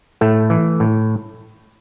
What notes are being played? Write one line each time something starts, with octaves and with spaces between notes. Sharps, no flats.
A2 A3
E3
A2